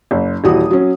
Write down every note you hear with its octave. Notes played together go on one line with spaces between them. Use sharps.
F#1
D#1 E3 F#4 D#6
F#3 C#4